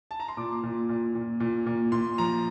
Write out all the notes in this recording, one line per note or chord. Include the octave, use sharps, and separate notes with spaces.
A5
A#5
C6
A#2 D6
A#2
A#2
A#2
A#2
A#2
A#2 C6
F3 A#5